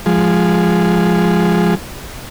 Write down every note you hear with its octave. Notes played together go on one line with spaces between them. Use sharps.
F3 G#3